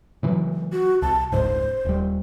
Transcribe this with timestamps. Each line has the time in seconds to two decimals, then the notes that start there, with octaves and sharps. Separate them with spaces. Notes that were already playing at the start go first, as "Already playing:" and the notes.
0.23 C#3 E3 F#3
0.73 F#4
1.02 C2 A5
1.32 F1 C#2 G#2 C5
1.85 D#1 G3